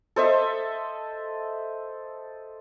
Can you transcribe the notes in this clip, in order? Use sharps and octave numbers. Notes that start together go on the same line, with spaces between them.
A4 C5 D#5 E5